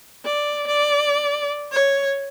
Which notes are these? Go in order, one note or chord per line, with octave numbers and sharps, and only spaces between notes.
D5
D5
C#5